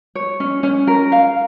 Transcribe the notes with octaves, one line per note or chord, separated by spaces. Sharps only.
C#5
C#4
C#4
A#4
F5